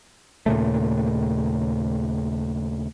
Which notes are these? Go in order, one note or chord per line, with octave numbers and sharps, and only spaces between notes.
D#2 A#2 C#3 A3